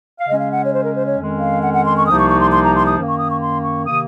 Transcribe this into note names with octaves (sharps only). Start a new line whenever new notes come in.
F5
C#3 G#3 C#4 D#5
F5
F#5
C#5
C5
A#4
C5
C#5
F2 D#3 G#3 C#4
F5
F#5
F#5
C6
C#6
C2 C3 F3 A#3 D#4 D#6
C#6
C#6
C6
C6
A#5
C6
D#6
F#2 D#3 A#3
C#6
D#6
C#6
C6
C#6
C3 D#3 A#3 D#6